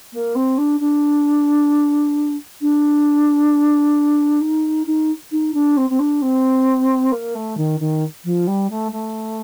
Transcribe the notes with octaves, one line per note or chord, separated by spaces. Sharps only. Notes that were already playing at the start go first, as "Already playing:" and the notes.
A#3
C4
D4
D4
D4
D#4
D#4
D#4
D4
C4
C4
D4
C4
A#3
A3
D#3
D#3
F3
G3
A3
A3